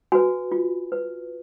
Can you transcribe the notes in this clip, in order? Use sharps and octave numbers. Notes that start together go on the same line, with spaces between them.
F#4 B4 G#5
F4
B4